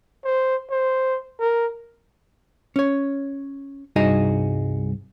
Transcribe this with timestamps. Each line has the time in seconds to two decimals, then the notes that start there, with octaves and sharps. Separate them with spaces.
0.25 C5
0.70 C5
1.39 A#4
2.76 C#4 C#5
3.96 C2 G2 D#4 F#4 G#4 D#5